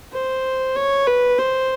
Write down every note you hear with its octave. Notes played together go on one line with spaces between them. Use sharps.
C5
C#5
B4
C5